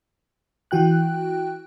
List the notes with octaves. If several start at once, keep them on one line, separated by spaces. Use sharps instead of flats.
E3 F#4 G5 F#6